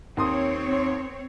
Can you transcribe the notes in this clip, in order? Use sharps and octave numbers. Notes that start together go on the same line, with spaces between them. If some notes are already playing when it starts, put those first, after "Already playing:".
D#2 C4 C#5 C6 D#6